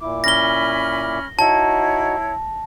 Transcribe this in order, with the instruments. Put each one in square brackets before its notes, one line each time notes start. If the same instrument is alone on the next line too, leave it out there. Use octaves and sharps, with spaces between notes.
[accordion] A#2 E4 D6
[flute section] C#4 B5 F6 [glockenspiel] A#6 G7
[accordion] D#4 F#4 [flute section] E4 C#5 [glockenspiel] A5